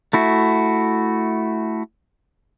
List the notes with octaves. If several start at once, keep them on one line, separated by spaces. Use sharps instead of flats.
A3 E4 F#4